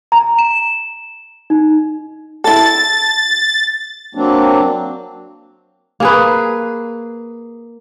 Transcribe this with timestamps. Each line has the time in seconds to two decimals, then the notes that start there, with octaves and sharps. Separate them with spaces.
0.12 A#5
0.39 E7
1.50 D#4
2.44 E4 A4 A6
4.15 F#3 A#3 C4 D4
6.00 A#3 G#4 B4